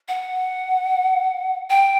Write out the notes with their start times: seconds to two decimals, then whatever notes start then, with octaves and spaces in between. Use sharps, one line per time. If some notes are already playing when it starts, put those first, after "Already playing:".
0.08 F#5
1.70 G5